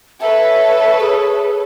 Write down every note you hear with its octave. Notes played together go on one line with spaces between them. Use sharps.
A4 B4 C#5 E5
G#4